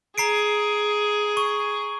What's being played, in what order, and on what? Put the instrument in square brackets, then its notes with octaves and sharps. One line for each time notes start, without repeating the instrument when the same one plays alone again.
[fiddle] G#4 [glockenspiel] A#5 C7 D7
[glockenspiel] C#6